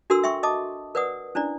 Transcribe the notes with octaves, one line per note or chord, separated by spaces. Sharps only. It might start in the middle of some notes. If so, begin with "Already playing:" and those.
D4 F#4 A4 A#4 C6 E6
E5 G5 C6 C#6
D#5 A5 D6 D#6
A#4 B4 D5 F#5 D#6
C#4 D4 E4 D5